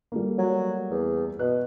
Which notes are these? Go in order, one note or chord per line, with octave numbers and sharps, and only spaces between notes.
G3 A3 A#3
F#3
E2
B2 F#6